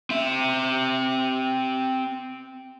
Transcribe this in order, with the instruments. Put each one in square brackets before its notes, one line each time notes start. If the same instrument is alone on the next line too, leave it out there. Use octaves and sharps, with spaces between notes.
[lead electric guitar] C4 E5